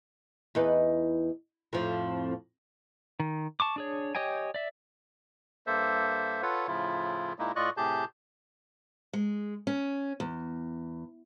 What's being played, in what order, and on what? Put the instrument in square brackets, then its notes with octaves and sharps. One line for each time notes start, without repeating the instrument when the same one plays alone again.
[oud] E2 D#4 B4
F2 A2 F3
[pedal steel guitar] D#3
A5 C#6 D6
D4 G#4 C#5
G4 C#5 D#5 G5 G#5
D5 E5
[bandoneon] G2 A#3 A4 C5 E5
F4 A4 B4 C#5 F#5
A2 C#3 F3 E4 F4
A#2 G#3 A#3 D#4 E4
A2 F4 D5 D#5 C#6 F#6
A2 C3 G4 G#4 A5 G6
[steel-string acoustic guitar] G#3
C#4
E2